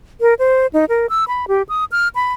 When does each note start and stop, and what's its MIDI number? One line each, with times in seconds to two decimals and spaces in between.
0.21 0.34 70
0.39 0.67 72
0.73 0.85 63
0.89 1.07 70
1.10 1.24 88
1.28 1.45 83
1.48 1.62 67
1.69 1.85 87
1.92 2.08 89
2.15 2.33 83